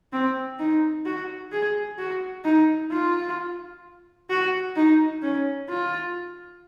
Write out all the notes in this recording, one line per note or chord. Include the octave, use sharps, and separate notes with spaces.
C4
D#4
F#4
G#4
F#4
D#4
F4
F#4
D#4
C#4
F4